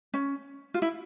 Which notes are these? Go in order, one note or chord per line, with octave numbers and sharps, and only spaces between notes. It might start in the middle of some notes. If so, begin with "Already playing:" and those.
C#4
F4
E4